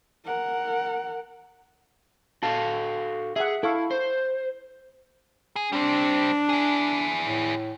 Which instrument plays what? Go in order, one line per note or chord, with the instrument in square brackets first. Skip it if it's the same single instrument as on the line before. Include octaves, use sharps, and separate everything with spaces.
[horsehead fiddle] A#4 F#5
[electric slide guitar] F#4 A4 F5 [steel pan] A5
[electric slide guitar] G#4 [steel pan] E5 F#5
[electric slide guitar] E4 [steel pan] A4 F5 C#6
[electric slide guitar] C5
[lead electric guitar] G#4
[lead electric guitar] G3 C4 [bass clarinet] D4
[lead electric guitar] E4 G#4
[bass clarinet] A2